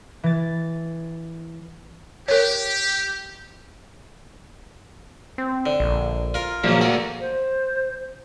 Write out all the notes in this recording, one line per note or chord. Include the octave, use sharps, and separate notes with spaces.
E3 A6
G4 A#4 C#5
C4
D3
A#1
F4 A#4
A#1 C#3 F3 F#3 A#3
F#4 A4 D5
C5